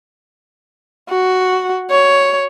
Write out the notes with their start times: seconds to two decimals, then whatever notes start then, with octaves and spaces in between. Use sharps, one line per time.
1.09 F#4
1.90 C#5